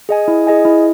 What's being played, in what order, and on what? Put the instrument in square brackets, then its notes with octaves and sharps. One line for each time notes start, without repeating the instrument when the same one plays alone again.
[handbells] G#4 D#5 G#5
E4
G#4 D#5 G#5
E4